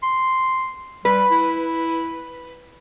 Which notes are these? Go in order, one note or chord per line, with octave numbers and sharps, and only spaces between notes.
C6
G3 B4
E4